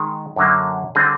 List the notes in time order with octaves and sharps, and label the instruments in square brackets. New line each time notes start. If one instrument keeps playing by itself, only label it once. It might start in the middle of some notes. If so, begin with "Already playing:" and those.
Already playing: [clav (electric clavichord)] D#3 G#3
F#2 D3 F#3 A#3
D3 G3 C4 G#4